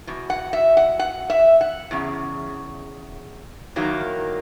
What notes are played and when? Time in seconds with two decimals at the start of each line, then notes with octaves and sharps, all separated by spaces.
0.07 E2 B2
0.30 F#5
0.53 E5
0.77 F#5
0.99 F#5
1.30 E5
1.61 F#5
1.91 E2 C#3
3.76 E2 D#3 F#3 A#3